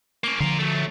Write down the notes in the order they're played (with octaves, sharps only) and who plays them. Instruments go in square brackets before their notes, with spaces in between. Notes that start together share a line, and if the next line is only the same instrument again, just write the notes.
[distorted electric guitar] A#3 C#4
[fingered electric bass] D3 F3 [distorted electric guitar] F4 A#4
[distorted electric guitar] F#3 A3